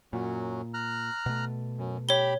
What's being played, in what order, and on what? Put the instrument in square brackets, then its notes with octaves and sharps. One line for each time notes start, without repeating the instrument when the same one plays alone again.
[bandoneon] F#2 F#3 [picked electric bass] A#2
[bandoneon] A#5 F6 F#6
[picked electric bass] B2 A3
[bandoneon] F#2
[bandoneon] G4 B5 [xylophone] C#5 G7